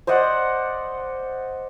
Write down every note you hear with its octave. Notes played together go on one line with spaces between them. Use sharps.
C5 D5 D#5 F#5